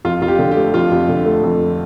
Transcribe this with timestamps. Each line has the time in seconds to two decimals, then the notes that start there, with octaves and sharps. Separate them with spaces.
0.05 F2 F4
0.21 F2 F4
0.28 G4
0.39 D3
0.52 G4
0.56 A3
0.74 F2 F4
0.92 F2
1.09 D3
1.26 A3
1.43 F2